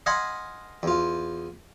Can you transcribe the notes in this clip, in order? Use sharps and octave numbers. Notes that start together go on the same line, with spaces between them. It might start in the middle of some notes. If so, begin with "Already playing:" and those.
D#5 F5 F#5 G#5 B5 C6
E2 F4